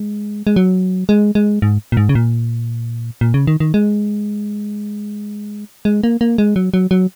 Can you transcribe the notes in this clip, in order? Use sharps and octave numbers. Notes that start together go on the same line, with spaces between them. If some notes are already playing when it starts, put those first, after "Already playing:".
Already playing: G#3
G#3
F#3
G#3
G#3
G#2
A#2
G#2
C#3
A#2
A#2
C#3
D#3
D#3
G#3
G#3
A#3
A#3
G#3
F#3
F#3
F#3